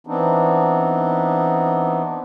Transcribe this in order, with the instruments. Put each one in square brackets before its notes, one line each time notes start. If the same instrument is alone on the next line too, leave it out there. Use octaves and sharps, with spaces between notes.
[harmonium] E3 B3 C4 D4 D#4